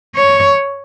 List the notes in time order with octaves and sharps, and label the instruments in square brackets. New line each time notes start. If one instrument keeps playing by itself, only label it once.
[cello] C#5